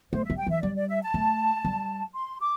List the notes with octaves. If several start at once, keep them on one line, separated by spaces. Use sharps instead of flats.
A3 C5
E5
G3
G5
E3 E5
G3 D5
D5
E5
A5
A3
G3
C6
D6